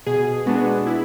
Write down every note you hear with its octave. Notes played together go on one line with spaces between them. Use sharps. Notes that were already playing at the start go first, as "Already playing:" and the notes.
B2 G#4
G#3 B3 D4 F#4
E4